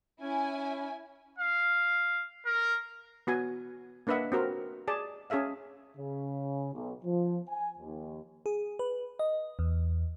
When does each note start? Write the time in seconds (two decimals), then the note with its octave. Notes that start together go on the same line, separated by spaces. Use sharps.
0.21 C#4 E4 G#5
1.38 F5
2.46 A#4
3.27 B3 F#4 G#5
4.07 A#3 D4 B4 D#5 E5 F#5
4.32 C4 F#4 A#4
4.88 G#4 D5 A5
5.30 C#4 G#4 A4 E5 F5
5.97 C#3
6.74 B1
7.03 F3
7.49 G#5
7.79 D#2
8.46 G#4
8.79 B4
9.19 D#5
9.59 E2